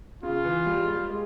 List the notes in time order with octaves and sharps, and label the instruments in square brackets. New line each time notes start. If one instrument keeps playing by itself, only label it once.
[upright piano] C#3 [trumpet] F4
[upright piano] E3
G3
G#3
G3
G#3